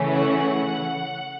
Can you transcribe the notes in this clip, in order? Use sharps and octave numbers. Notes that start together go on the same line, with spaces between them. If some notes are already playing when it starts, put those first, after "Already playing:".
Already playing: C#3 E3 A3 C#4
F#5